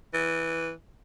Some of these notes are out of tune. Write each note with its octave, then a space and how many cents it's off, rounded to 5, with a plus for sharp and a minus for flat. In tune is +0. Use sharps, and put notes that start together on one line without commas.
E3 -5